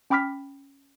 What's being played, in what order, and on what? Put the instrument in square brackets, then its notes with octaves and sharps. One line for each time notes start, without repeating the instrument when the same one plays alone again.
[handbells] C#4 G5 B5 D6 F6 B6